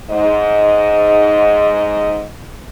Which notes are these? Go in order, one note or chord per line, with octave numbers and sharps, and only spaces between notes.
G#2 D#5